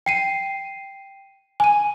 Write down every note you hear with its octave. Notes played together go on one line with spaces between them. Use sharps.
G5 C7 D#7
G#5 D#7